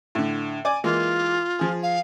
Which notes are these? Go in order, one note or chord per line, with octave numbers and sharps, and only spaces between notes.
A2 D3
D5 G#5 D6
E3 G#3 A#3 F4
F3 G#4
F5